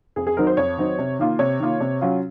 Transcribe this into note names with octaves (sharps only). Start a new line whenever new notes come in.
F2 G#4
G#4
D#3 F#3 C4 D#4 A#4
C5
F2 C#5
D#3 F#3 C4 D#4
C3
D#3 A#3 F4
C3 C#5
D#3 A#3 F4
C3
F#3 C#4 F4